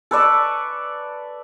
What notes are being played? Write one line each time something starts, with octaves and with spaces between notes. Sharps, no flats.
A4 B4 D5 C#6